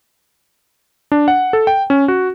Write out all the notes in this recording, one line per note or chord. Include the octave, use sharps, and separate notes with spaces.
D4
F#5
A4
G5
C#4
F#4